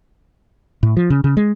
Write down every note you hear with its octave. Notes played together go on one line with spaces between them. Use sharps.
A2
F3
C#3
C#3
G#3